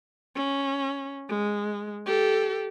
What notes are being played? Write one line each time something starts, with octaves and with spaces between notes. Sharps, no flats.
C#4
G#3
G4 A4